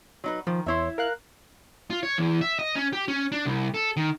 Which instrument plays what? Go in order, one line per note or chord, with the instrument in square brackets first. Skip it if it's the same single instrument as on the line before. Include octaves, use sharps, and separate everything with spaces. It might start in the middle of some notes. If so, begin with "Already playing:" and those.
[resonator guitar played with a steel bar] F#3 D#4 B4
[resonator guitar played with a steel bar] D#3 [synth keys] F3
[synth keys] E2 C#5 C6 [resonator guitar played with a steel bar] E4 E5
[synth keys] A#4 F5 F#6
[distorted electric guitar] F4
C#5
E2
E5
D#5
C#4
G4
C#4
D4
C2
A4
D#3